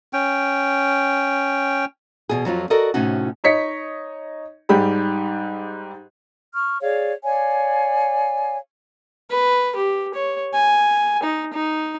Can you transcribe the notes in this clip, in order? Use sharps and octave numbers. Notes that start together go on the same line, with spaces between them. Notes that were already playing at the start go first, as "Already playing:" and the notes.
C#4 G5
E2 B2 G#4
F2 F#3 C4 F4
F#4 A4 A#4 D5 D#5
A2 C3 C#4 D#4 F#4
D#4 C#5 D#5 B6 C#7
G#2 G3 G4 G#4 B5
C#6 F6
G#4 C#5 D5 F5
C#5 D5 F5 G#5
B4
G4
C#5
G#5
D#4
D#4